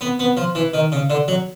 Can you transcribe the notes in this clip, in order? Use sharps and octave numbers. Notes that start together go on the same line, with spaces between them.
B3
B3
F3
E3
D#3
C#3
D3
F#3